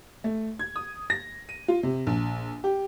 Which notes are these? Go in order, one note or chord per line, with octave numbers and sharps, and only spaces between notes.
A3
G#6
D#6
A#6
D#7
F4
C3
A#1
G4